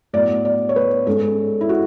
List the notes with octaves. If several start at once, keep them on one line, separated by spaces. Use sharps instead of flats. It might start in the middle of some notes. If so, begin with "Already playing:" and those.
A2 F#3 B3 D5
D5
C#5
B4
G#2 G#3 C#4 A4
E4
F#4